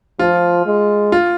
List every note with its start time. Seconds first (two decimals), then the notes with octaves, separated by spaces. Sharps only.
0.19 F3 F4
0.66 G#3
1.12 F4